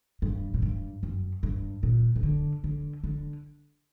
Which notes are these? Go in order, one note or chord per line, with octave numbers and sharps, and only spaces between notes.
G2
A2
G2
F#2
G2
A#2
C3
D3
D3
D3